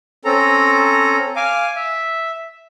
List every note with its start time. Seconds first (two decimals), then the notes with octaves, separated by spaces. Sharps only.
0.25 C4 C#4 A4 A#5
1.36 F5 G#5 D6
1.76 E5